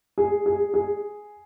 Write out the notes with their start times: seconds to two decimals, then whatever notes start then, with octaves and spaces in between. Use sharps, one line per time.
0.18 G#4
0.46 G#4
0.74 G#4